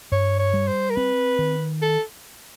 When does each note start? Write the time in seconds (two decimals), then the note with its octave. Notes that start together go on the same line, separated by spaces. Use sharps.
0.12 G2 C#5
0.39 C#5
0.54 G3
0.68 C5
0.90 A#4
0.96 C4 B4
1.39 D#3
1.82 A4